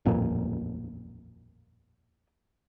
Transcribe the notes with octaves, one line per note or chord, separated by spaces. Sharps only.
D#1 A1 F2 A#2